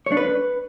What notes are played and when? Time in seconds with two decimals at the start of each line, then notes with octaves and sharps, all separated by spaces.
0.06 C#5
0.12 D4
0.17 B4